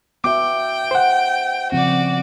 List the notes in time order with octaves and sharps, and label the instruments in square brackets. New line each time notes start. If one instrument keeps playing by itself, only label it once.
[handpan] B3 F#4 E5 [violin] G5 [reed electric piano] D6
[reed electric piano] C5 F#5
[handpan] C#3 F3 C4 [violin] F#4 D5